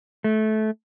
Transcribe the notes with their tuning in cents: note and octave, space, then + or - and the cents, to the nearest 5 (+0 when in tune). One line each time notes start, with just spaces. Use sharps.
A3 -20